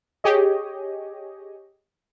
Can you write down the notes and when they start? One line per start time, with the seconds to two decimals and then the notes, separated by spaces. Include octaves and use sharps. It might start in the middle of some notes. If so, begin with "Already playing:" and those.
0.24 G4 G#4 C#5 D#5